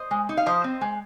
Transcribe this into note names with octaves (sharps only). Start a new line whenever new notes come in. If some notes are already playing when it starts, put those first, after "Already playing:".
Already playing: C5 D#5
G#3
D#4
F5
F3 C5 D#5
C4
G#3